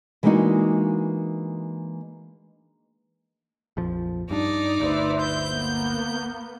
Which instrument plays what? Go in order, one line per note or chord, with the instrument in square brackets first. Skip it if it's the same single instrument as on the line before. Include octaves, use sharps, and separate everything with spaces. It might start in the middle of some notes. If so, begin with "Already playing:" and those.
[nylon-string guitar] E3 G#3 A#3 D4 D#4 F#4
[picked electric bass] A#1 F2 F3
[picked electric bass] G2 D4 [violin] D#4 D5
[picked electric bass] G1 D2 [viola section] B4 C5 E5
[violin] G6
[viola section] A#3 B3